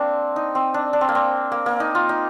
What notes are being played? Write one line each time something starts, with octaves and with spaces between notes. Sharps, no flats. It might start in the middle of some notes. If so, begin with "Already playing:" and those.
Already playing: A#3 C4 D4
D#4
C4
D4
D4
C4
A#3
C4
A#3
A#3
D#4
F4
D#4